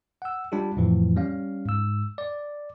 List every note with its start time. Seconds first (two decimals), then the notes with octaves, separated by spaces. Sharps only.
0.22 F#5 E6
0.52 G3 D4 F4 G4
0.77 F2 A2 E3 F3
1.16 G3 C#4 F5
1.66 G#2 E6
2.18 D5